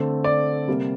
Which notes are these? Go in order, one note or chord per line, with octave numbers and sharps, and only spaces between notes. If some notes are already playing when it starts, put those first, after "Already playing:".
Already playing: D3 A3 C4
D5
C3 G3 A#3